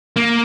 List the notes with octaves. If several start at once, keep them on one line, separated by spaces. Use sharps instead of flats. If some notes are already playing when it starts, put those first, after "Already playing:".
A#3